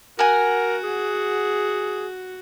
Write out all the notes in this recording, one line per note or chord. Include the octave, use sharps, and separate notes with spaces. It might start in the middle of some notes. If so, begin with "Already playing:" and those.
F#4 A#4 F#5 G#5
G#4